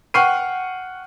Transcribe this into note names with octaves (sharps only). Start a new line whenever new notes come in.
F#5 G5 C#6 F6 C7 D#7